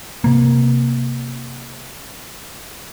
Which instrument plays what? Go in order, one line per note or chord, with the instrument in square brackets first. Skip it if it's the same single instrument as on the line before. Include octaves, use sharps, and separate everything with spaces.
[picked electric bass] C3 A#3